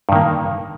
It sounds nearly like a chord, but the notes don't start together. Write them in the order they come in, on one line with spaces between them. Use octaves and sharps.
G2 D#3 A#3